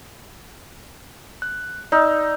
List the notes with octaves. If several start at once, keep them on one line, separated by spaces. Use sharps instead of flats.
F#6
D#4 D5 E6